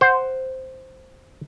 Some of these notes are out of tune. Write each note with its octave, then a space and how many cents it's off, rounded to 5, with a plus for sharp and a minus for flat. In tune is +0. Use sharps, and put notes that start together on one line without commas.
C5 +0 F#5 +5